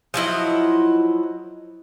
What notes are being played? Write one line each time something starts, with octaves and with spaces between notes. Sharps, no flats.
F3 F#3 E4 D#5